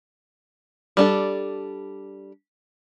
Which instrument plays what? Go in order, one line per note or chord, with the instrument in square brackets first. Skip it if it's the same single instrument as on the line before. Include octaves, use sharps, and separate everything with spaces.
[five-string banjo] G3 D4 A4